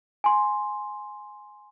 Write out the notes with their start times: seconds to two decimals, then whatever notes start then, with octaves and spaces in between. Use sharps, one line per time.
0.24 G#5 C6